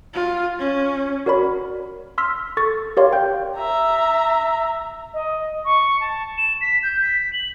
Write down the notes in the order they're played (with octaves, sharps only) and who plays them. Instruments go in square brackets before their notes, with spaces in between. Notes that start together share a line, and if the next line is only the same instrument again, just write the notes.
[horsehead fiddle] F4
C#4
[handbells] F#4 A#4 C#5 D5 B5
C6 E6 F6 B6
A4 C#6 A6
G4 A#4 C#5 D5 F5 C6
G5 G6
[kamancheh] E5 A#5
[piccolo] D#5
C#6
A5
E7
B6
G6
B6
F#7